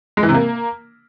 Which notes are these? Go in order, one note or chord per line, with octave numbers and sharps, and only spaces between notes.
G#3
E3
C3
A#3